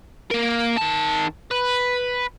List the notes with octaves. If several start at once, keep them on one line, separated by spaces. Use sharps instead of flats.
A#3 A#4
D#3 A5
B4